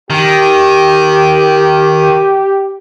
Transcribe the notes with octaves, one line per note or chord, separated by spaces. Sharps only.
D#3 G4